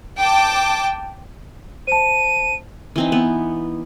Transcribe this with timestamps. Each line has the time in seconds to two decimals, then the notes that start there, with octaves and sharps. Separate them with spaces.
0.18 G5 A5 D6
1.87 C5 A5 D#7
2.96 E3 C4 D#4
3.12 B3